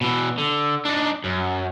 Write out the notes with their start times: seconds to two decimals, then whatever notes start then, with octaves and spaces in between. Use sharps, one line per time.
0.01 B2 E3
0.38 D3
0.85 D4 D#4
1.24 F#2